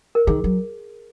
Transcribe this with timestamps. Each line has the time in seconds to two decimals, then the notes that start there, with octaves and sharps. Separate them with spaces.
0.15 A#4
0.27 D#3 G#4
0.44 F#3